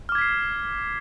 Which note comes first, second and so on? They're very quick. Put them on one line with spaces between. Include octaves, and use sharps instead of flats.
F6 D6 G#6 B6 C7